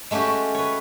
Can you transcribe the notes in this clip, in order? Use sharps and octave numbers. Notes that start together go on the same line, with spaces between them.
G#3 A3 C#4 F#4 G4
B4 C#5